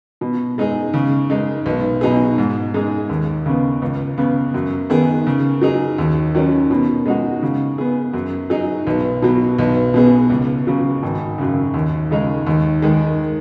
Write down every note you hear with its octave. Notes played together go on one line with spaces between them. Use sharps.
B2
G#3 D#4 G#4
C#3
G#3 D#4
B1
B2 F#3 D#4 G#4
G#2
G#3 D#4 G#4
D#2
C#3 B3
C#2
C#3 B3
F#2
D#3 B3 G#4
C#3
F#3 D#4 G#4
D#2
D#3 F#3 C#4
B2
G#3 D#4 F#4
C#3
B3 G#4
F#2
F#3 D#4 G#4
B1
B2 F#3
B1
B2 B3 G#4
C#2
C#3 F#3
G#1
F#2 C#3
D#2
C#3 G#3 D#4 G#4
D#2
D#3 G#3